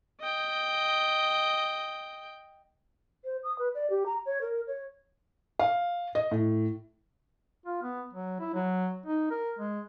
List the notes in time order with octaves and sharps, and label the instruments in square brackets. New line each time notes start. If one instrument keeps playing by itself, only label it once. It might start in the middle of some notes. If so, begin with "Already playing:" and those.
[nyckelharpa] D#5 G5
[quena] C5
D#6
B4
D5
G4
A#5
C#5
A#4
C#5
[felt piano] F5
D#5
A2
[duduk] F4
B3
F#3
E4
F#3
D#4
A#4
G#3